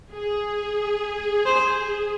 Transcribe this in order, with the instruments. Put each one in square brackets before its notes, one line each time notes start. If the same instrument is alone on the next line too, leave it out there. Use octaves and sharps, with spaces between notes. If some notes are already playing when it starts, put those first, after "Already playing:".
[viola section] G#4
[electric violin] C5